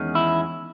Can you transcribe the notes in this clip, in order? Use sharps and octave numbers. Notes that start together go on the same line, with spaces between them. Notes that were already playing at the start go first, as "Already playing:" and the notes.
Already playing: E2 D#3 G#3 C#4
E4